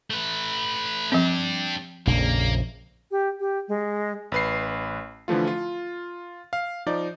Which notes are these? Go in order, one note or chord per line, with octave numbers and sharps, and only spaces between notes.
A3 B4
F3 C4 D4 G4
A#1 F2 C#3 A#3
G4
G4
G#3
A1 B4 C7
D3 E3 F3 A3 F4
F4
F5
F3 D#4 D5